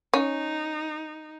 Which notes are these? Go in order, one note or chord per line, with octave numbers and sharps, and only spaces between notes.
C#4 D#4